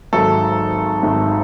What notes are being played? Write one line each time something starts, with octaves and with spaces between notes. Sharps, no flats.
G#1 G#2 D#3 F#3 A3 A4
G#1 G#2 D#3 F#3 A3